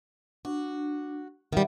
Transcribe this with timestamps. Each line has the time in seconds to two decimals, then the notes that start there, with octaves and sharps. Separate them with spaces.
0.45 D4 F#4
1.53 D#3 G3 E5 F#5